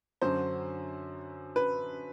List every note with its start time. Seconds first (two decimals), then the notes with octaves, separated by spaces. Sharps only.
0.22 F#2 D3 F#3 C5
1.56 B4